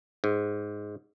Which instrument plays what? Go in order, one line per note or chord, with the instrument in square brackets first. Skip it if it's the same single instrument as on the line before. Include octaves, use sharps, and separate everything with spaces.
[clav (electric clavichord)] G#2